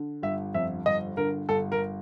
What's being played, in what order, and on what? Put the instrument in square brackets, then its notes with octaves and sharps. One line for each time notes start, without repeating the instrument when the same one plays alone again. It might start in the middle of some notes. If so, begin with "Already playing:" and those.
Already playing: [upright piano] D3
G1 E5
F2 E5
G1 D#5
D3 A#4
G1 A4
A#4